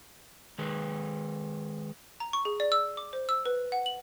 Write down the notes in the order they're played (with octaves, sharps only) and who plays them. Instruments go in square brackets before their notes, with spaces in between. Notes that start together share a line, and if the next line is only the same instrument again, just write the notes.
[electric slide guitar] D#3 G#3 B4
[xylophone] A#5
C#6
G#4
D5
E6
D6
C5
E6
B4
F#5
F#7